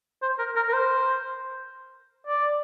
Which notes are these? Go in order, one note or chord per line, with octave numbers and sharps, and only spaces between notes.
C5
A#4
A#4
A#4
C5
D5